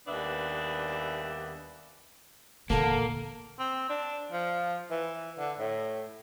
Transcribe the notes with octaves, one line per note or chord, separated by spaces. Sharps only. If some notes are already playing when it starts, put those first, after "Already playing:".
D#2 G3 B3 D4 B4 E5
E2 A#2 D3 A#3 A5
C4
D4
F3
E3
D3
A2